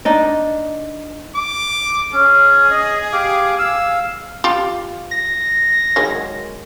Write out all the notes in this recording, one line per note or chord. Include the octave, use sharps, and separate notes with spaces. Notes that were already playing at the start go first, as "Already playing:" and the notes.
D4 D#4 D#5
D6
C#4 G#4
D#5
G4 F5 D6
F5 E6
F4 G4
A#6
D#3 F#3 G#3